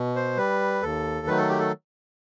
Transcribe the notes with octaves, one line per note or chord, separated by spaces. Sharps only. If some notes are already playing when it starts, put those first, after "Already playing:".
Already playing: B2
C5
G3 B4
D#2 A4
D#3 F#3 A3 B4
A4
G4
A4